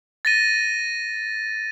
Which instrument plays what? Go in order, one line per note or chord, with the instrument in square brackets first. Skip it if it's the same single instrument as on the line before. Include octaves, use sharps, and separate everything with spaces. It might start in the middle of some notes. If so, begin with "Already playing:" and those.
[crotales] A6 A#6 D#7